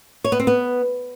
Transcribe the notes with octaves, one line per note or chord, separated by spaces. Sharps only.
C#5
B3
C4
B3